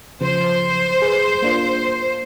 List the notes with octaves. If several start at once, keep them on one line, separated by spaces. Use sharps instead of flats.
C#3 F3 C5
G#4 B4
A#3 D4 F4